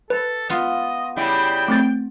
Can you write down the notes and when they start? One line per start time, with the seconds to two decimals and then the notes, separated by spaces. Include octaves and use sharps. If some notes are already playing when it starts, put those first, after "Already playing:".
0.10 A4 B4
0.50 B3 F4 D#5
1.16 C#3 G3 E4 G5
1.68 A3 C4 A6